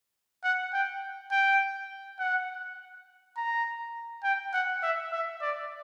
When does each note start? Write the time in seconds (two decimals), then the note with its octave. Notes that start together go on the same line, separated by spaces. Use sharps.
0.44 F#5
0.73 G5
1.31 G5
2.19 F#5
3.37 A#5
4.24 G5
4.53 F#5
4.82 E5
5.12 E5
5.42 D5